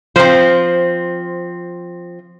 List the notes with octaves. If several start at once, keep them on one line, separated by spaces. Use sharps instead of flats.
F3 C4 C5